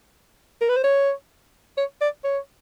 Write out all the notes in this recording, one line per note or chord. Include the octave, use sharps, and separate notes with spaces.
A#4
B4
C5
C#5
C#5
D5
C#5